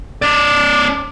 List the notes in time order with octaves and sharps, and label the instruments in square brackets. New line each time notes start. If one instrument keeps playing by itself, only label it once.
[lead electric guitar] C#4 D5 [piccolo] D6